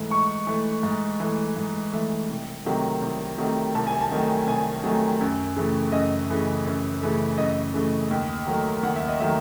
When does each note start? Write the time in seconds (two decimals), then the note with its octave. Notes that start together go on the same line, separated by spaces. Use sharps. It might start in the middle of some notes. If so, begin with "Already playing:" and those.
Already playing: G#2 E3 A3
0.11 G#2 C#6
0.47 E3 A3
0.83 G#2
1.20 E3 A3
1.57 G#2
1.93 E3 A3
2.29 C2
2.65 C3 D#3 F#3 A3
3.02 C2
3.38 C3 D#3 F#3 A3
3.75 C2 A5
3.87 G#5
4.01 A5
4.11 C3 D#3 F#3 A3
4.47 C2 G#5
4.84 C3 D#3 F#3 A3
5.21 F#2
5.56 C#3 E3 A3
5.92 F#2 D#5
6.28 C#3 E3 A3
6.66 F#2
7.01 C#3 E3 A3
7.38 F#2 D#5
7.74 C#3 E3 A3
8.11 D#2
8.47 D#3 F#3 A3
8.83 D#2 F#5
8.96 E5
9.08 D#5
9.19 D#3 F#3 A3 E5